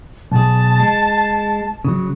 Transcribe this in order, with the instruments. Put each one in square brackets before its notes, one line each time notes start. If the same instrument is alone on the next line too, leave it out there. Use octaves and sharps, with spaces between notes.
[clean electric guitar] B1 G#4 [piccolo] A5
[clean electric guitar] G#3
C#3 F#3